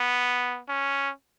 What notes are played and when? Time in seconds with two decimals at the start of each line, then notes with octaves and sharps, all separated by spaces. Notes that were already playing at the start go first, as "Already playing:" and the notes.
Already playing: B3
0.69 C#4